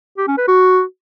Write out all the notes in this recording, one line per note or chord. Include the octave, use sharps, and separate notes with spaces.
G4
C#4
B4
F#4